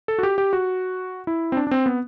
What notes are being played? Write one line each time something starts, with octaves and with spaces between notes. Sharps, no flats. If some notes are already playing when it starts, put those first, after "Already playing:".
A4
F#4
G4
G4
F#4
E4
C4
D4
D4
C4
B3